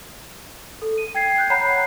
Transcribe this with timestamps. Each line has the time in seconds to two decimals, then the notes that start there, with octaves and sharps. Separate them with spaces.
0.82 A4
0.98 D#7
1.15 G5 G#6 C7
1.38 F#6 G6
1.50 C#5 F#5 A#5 B5 F#6 C7